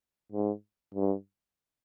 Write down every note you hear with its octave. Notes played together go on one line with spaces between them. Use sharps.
G#2
G2